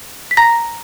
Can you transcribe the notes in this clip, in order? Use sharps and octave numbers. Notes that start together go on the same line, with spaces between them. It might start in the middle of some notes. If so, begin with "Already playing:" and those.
B6
A#5 A#6